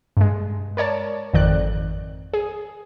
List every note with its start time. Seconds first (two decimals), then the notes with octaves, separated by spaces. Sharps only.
0.17 G2 G#3
0.77 A#4 C#5 D5 A5
1.34 G#1 F2 D#3 D5 F#6
2.34 G#4